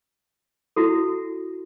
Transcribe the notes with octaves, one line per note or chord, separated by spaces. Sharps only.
E4 F#4 A4